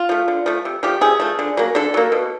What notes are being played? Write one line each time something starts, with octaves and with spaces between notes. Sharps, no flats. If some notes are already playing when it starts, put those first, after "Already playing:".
Already playing: F4
F3 A3
D3
F3 A3
C3
F3 A3 G4
C3 G#4
F3 A3
D3
F#3 A#3
D3 A4
F#3 A#3
B2